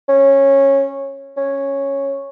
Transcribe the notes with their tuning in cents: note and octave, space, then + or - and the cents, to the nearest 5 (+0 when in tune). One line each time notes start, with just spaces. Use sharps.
C#4 -15
C#4 -5